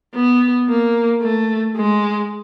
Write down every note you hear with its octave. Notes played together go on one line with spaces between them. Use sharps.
B3
A#3
A3
G#3